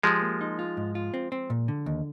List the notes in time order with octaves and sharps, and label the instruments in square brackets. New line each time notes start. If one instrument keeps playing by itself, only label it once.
[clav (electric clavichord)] F3 G#3 [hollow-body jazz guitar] G4
[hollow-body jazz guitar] A#3
D#4
F4
G#2
F4
C4
C4
A#2
D3
D#2